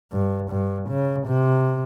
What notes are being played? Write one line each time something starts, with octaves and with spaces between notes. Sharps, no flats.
G2
G2
C#3
C3